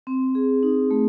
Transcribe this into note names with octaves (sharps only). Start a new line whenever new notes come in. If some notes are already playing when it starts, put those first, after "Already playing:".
C4
G#4
D#4
A3